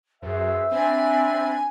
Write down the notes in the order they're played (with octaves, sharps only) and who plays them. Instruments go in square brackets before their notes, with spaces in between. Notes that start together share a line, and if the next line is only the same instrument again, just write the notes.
[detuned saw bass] F#2 [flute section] G#4 B4 C5 [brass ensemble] E5
[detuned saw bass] C4 [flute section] D4 D5 B5 [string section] G#5